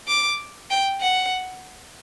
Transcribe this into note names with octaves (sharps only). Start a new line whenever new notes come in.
D6
G5
F#5